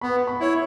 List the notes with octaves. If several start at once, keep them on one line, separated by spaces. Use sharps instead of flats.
B3 B5
B5
E4 C#5